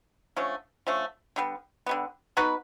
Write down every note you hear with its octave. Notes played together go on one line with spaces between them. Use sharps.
D3 F3 A3 C#4
D3 F3 A3 C#4
D3 G3 B3
D3 G3 B3
B3 D#4 F#4 B4